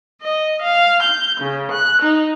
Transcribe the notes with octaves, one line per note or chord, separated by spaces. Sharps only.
D#5
F5
G6
C#3
F#6
D#4